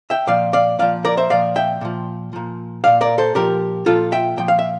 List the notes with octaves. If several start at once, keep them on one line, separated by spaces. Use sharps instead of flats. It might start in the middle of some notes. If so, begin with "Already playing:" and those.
E5 G5
A#2 F3 D5 F5
D5 F5
A#2 F3 D5 F5
A#4 D5
C5 E5
A#2 F3 D5 F5
E5 G5
A#2 F3
A#2 F3
A#2 F3 D5 F5
A#4 D5
A4 C5
A#2 F3 G4 A#4
A#2 F3 F4 A4
E5 G5
A#2 F3 G5
F5
E5